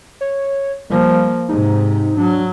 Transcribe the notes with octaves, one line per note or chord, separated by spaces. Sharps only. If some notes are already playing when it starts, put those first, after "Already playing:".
C#5
F3 G3 A#3
G#2 C3 D#4
F#3 D4